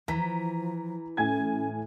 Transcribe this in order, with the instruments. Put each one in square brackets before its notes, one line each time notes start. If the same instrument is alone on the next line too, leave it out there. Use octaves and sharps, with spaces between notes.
[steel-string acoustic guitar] E3 [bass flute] F3 [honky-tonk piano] A#5 B6
[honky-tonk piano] A2 G#5 G#6 [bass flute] C#4